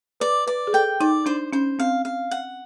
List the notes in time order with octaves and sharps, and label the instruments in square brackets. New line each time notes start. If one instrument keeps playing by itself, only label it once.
[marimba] B4 [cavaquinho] D5
[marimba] B4 [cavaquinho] D5
[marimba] G#4
[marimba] A4 [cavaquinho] G5
[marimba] D#4 [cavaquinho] D5
[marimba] D4 [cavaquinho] C5
[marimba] C#4 [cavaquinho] C5
[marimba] C4 [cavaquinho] F5
[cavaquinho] F5
F#5